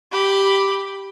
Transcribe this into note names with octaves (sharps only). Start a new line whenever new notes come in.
G4 B5